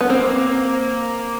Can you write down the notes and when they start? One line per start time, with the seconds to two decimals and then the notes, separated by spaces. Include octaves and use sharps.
0.01 B3
0.10 A#3 C4